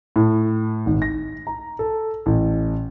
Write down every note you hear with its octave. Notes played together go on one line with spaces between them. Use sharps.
A2
G#1
A#6
A#5
A4
A1